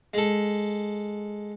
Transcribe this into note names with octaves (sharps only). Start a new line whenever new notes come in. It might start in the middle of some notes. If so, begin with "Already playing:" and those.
G#3 A4